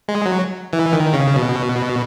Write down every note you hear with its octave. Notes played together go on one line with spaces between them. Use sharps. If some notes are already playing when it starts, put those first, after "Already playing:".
G#3
F#3
E3
D#3
C#3
B2